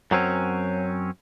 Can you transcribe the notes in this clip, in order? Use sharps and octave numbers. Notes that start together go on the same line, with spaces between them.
F#2 F#3 C4 C#4